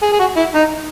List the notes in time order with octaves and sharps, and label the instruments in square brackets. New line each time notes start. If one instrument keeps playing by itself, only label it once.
[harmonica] G#4
G#4
F#4
E4
D#4